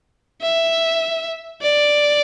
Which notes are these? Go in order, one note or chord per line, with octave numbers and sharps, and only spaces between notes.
E5
D5